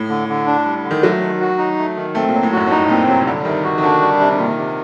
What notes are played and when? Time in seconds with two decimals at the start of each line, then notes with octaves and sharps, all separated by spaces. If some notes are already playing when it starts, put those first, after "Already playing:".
Already playing: A2
0.09 D3
0.28 D3
0.46 D4
0.65 G3
0.84 D3
0.91 D#3
1.03 F#3 A3
1.21 D#3
1.41 F#4
1.58 D#4
1.78 A3
1.96 D#3
2.15 A3 C4
2.29 A#2
2.34 F#3
2.43 A2
2.52 F#2 F#4
2.67 A2
2.71 G2 D#4
2.89 A#2 C4
3.08 C3 F#3
3.21 C3
3.27 D3 G3
3.45 C3 D#3
3.64 D#3 F#4
3.78 D#3
3.83 D3 D4
4.01 G3
4.20 C3
4.38 A#2 D#3
4.57 C3